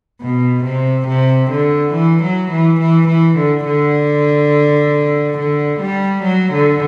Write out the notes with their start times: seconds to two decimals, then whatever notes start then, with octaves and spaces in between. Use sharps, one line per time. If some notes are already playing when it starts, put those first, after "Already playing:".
0.21 B2
0.64 C3
1.07 C3
1.50 D3
1.93 E3
2.23 F#3
2.51 E3
2.80 E3
3.08 E3
3.37 D3
3.66 D3
5.38 D3
5.80 G3
6.23 F#3
6.53 D3